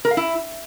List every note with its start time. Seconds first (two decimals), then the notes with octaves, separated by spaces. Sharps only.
0.05 A#4
0.11 F5
0.17 E4